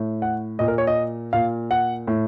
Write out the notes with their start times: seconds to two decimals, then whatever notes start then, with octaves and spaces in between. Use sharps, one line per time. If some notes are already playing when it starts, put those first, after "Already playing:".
Already playing: A2
0.22 F#5
0.59 A#2 D#5
0.68 A#4
0.78 C#5
0.87 D#5
1.33 A#2 F5
1.71 F#5
2.08 A2